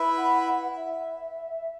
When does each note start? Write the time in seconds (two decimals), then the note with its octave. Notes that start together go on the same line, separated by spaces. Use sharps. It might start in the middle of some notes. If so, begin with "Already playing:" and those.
Already playing: E4 B4 E5
0.17 F#5
0.47 F#5
0.76 E5